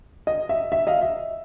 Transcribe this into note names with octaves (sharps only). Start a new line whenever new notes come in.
D#5
E5
E5
D#5 F5
E5